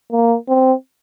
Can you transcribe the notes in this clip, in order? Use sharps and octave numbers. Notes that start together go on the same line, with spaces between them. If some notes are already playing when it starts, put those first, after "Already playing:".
A#3
C4